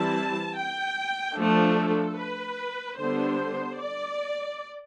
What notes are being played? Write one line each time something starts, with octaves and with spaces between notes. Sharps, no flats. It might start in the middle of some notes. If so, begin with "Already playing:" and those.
Already playing: E3 G3 C4 E4 A5
G5
F3 A3 D4 A4
B4
D3 G3 B3 D4 C5
D5